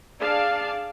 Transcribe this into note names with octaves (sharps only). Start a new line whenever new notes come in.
D4 G#4 D5 F5 A5